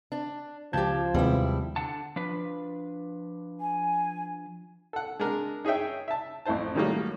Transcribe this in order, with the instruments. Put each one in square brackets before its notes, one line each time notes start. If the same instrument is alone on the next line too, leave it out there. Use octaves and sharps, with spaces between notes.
[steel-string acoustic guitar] D4
[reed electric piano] C#2 G6 G#6 [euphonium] F3 [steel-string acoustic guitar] G4 A5
[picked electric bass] D#2 [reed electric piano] C3 G#3 B3 [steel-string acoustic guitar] G3 E4
[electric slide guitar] D3 F#5 A5
F3 D4 B4
[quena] G#5
[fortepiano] A4 F#5
G#3 D4 A#4
D#4 G#4 C#5 E5 G5
E5 A5
A1 F2 E4 C5 A5
A2 D#3 F#3 G3 A3 A#3